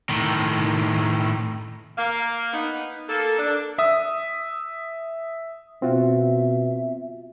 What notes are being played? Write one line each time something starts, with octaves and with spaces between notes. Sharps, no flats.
A2 D#3
A#3 F5
B3 D#4
A#3 A4
D4
E5 D#6
B2 C4 F4 F#4 E5